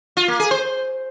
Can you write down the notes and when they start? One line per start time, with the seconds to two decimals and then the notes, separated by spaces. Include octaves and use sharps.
0.17 F4
0.28 A#3
0.40 G#4
0.51 C5